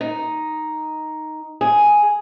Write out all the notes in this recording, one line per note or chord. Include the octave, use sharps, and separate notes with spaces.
D#4
G#4